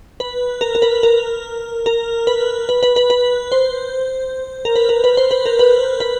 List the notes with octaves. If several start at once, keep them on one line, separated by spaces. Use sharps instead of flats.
B4
A#4
A#4
B4
A#4
A#4
B4
B4
B4
B4
B4
C5
A#4
B4
A#4
B4
C5
B4
A#4
B4
B4